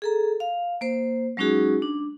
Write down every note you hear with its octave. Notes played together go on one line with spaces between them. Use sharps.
G#4 A4 A#5
F5
A#3 C5
F#3 G#3 C#4 D#4 F#4 G#4
D4